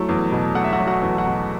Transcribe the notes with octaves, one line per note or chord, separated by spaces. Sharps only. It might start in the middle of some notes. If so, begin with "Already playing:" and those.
Already playing: F#3 A3 E4
E2
B2
A3 F#5
E5
F#4 F#5
F#3
F#4 F#5
E2
F#4 F#5
B2